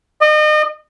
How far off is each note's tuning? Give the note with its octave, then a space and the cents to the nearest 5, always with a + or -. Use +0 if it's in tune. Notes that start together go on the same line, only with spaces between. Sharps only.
D#5 -35